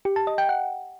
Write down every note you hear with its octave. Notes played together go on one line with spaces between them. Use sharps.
G4
A5
D#5
G5
F#5